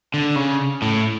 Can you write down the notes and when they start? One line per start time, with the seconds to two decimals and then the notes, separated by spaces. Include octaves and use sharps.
0.14 D3
0.36 C#3
0.82 A2